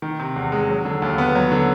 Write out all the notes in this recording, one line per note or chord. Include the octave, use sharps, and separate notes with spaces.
D#3
C3
E2
G#3
F#3
D3
D#2
B3
F#3
D3